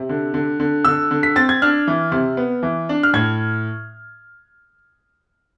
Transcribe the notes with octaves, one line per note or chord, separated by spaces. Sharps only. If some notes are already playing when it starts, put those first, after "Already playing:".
Already playing: C3
D3
D3
D3
D3 E6
D3
B6
C4 A6
G#6
D4 F6
E3
C3
B3
E3
D4
F6
A2 G#6